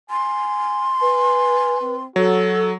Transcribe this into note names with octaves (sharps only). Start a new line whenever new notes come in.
G#5 C6
B4 G#5
C4
F#3 F#4 A4